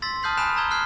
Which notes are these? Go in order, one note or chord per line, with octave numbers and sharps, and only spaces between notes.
C6 E6 A6 B6
A5 D#6 F6 G6 C7 F#7
G#5 B5 F#6 C#7 E7
A#5 E6 G#6 G7
F6 F#6 G#6 C7